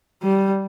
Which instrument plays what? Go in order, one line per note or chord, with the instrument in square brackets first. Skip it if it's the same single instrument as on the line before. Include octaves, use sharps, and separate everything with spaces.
[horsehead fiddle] G3